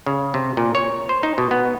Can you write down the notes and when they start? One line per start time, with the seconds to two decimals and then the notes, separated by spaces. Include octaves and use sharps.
0.06 C#3
0.34 C3
0.57 A#2
0.75 C#5
1.09 C5
1.23 D#4
1.38 B2
1.51 B3